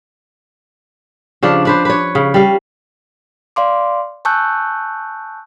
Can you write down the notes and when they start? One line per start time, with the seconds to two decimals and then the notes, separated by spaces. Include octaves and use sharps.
1.43 C#3 F3 D4
1.65 D4 B4 C5
1.85 B4 C#5
2.15 C#3
2.34 G3 F5
3.56 D5 F5 C6 D6
4.25 G#5 A5 C#6 E6 F#6 G6